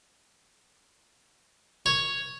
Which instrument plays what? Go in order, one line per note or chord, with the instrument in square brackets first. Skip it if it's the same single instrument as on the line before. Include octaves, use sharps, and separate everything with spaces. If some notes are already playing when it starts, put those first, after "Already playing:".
[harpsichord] C#5